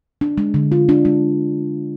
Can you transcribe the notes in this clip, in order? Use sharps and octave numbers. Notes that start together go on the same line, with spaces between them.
D4
G#3
D3
F4
D4
G#3